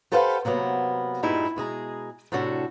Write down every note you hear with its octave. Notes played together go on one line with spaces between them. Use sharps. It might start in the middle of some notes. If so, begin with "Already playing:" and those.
G4 A4 B4 C5 F5 F#5
C3 F#3 A#3 B3
G2 A#2 G3 G#3 D#4 E4
B2 G#3 G#4 A#5
A2 C3 D4 F#4 A4